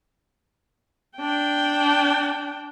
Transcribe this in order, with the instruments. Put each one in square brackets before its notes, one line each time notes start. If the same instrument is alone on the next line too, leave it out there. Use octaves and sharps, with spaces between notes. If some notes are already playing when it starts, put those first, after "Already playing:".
[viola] D4 G5